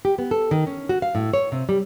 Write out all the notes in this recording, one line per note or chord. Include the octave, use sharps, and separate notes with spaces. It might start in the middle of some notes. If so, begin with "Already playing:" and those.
G4
B3
A4
D#3
C#4
F#4
F5
A2
C#5
C3
G3